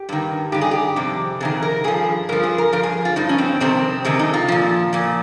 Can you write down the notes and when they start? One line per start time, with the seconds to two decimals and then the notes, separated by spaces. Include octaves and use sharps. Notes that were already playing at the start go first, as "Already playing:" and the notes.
Already playing: G4
0.09 G2 D#3
0.52 G2 D#3 G4
0.61 G#4
0.71 G4
0.96 F2 C3
1.40 F2 C3 D#3 G#4
1.63 A#4
1.84 G2 F3 G#4
2.29 G2 F3 A#4
2.43 G#4
2.58 A#4
2.73 G2 F3 A#4
2.83 G#4
3.05 F4
3.16 G2 F3 D#4
3.29 C#4
3.38 C4
3.60 F2 C3 D#3 C4
4.05 F2 C3 D#3 G#3
4.19 D#4
4.34 F4
4.48 A#2 F3
4.93 A#2 F3